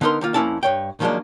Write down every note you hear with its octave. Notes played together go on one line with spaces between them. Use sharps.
D3 B3 D#4 A#4 C6
D#3 A#3 F4
F2 F3 A#3 C#4 E4 A5
G2 C#5 G5
D#3 F3 F#3 G#3 A#3 D4